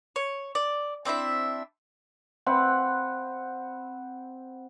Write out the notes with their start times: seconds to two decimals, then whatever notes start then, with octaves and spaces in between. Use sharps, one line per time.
0.16 C#5
0.55 D5
1.05 C4 D4 E4 E5
2.46 C4 F#5 B5